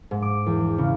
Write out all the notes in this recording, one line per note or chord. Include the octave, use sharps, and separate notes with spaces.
G#2
D6
E2
C#3